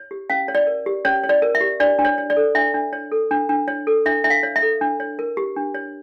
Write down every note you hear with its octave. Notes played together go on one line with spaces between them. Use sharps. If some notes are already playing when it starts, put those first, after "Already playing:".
Already playing: C#5
G4
C#4 F5
C#5
D5
A#4
G4
C#4 C#5
C#5
D5
A#4
E5
G4
D4 D5
D4
C#5
C#5
D5
A4
D4 E5
D4
C#5
A4
D4
D4
C#5
A4
D4 E5
D4 E5
F5
C#5
E5
A4
D4
C#5
A#4
G4
D4
C#5